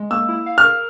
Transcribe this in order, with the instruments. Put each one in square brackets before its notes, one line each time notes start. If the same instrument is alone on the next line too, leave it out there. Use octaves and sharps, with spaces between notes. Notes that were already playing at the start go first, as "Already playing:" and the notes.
Already playing: [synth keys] G#3
[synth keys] A#3 [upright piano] E6
[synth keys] E4
F5
[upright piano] F6
[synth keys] A#4